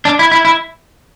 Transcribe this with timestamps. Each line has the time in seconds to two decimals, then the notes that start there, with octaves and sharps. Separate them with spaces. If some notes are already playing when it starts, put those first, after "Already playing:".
0.05 D4
0.19 E4
0.32 E4
0.45 E4